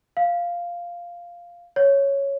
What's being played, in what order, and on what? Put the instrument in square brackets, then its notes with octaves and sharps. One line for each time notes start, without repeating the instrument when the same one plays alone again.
[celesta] F5
C#5